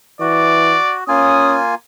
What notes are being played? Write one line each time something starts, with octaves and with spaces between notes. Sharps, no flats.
E3 F#4 D5
A#3 C#4 F4 G#5 D#6